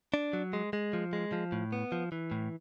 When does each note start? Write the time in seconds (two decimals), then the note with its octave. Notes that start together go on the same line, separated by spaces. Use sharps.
0.14 D4
0.33 F#3
0.53 G#3
0.73 G#3
0.93 F3
1.13 G#3
1.32 F3
1.52 A2
1.72 B3
1.92 F3
2.12 E3
2.31 A2